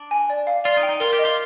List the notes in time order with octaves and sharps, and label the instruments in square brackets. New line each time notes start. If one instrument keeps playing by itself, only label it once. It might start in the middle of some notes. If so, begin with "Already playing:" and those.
Already playing: [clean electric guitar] D4
[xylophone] G#5
D5
F5
[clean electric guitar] F4 [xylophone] D5
[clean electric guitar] D#4
[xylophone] G5
[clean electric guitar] D#4
[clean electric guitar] F4 [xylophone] A#4
[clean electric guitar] G4
[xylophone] D#5
[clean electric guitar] F4